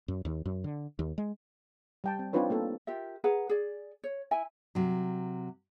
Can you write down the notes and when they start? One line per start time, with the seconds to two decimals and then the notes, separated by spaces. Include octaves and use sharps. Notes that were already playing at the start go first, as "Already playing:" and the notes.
0.08 F#2
0.25 D#2
0.46 F#2
0.64 D3
0.99 D#2
1.18 G#3
2.04 G3 G5 A5
2.19 C4
2.33 C4 D4 D#4 F4 B4 C#5
2.50 A#3 B3 A4
2.87 F4 G4 A#4 E5
3.24 G#4 B4 F#5 A#5
3.49 G#4 D5
4.04 C#5
4.31 E4 E5 G#5
4.75 C3 F#3